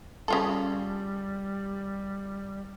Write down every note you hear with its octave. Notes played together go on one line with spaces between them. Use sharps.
C#3 G3 F4 A4